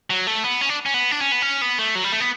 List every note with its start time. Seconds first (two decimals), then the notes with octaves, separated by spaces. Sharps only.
0.10 F#3
0.27 A3
0.44 B3
0.61 C#4
0.69 D4
0.86 C#4
0.94 B3
1.11 D4
1.21 C#4
1.32 B3
1.42 C#4
1.62 B3
1.79 A3
1.95 F#3
2.04 G3
2.12 A3
2.20 B3